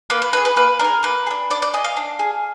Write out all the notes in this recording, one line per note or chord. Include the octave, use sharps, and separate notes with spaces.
A#3 B4
B4
D4 B4
G#4
B4
A#3 B4
D4 G#4 A#4
A#3 B4
G#4
D4
D4 D5
D5
G#4 D#5
F5
D4
G#4